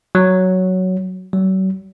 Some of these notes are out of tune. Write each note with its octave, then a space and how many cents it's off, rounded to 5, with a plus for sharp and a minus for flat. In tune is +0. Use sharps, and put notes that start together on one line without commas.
F#3 +5
F#3 +40